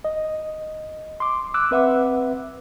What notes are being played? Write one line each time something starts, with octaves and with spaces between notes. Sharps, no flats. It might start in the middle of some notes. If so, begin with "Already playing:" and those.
D#5
C6 D6
D6 E6 F#6
C4 B4 E5 F#5